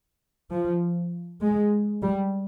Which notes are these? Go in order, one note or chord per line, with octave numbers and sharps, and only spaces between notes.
F3
G#3
G3